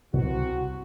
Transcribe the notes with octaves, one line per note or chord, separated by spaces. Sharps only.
C2 C3 F#4